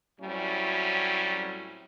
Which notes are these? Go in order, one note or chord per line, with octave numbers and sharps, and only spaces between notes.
A2 F#3 G3 C4 C#4 E4